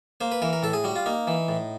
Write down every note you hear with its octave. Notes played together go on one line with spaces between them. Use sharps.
A#3 C5
B4
E3 A#4
A#4
A2 A4
G#4
G3 F#4
F4
A#3 D#4
E3
A2